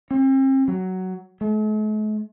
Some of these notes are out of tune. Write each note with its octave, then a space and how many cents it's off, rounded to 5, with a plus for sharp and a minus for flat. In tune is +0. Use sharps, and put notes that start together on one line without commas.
C4 +40
F#3 +10
A3 -45